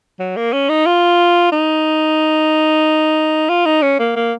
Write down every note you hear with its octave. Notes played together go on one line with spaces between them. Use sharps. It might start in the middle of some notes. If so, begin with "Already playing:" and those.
F#3
A#3
C#4
D#4
F4
D#4
F4
D#4
C#4
A#3
A#3